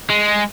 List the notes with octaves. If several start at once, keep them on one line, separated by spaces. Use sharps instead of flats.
G#3